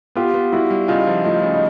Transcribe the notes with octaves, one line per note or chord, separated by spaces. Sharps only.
B3 F4 G4
B3
G3 E4 F#4
G3
C#3 D#4 F4
F3
A3 D#4 F4
C#3
D#4